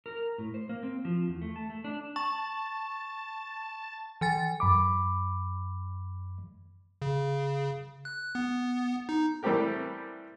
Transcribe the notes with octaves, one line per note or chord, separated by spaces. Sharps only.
A#4
A2
C5
A#3
C4
F3
E2
A3
A5
A3
D4
A5 C#6
E3 G#5 A6
F#2 B5 D6
C#3
F#6
B3
D#4
E3 G3 A3 C4 G4 A#4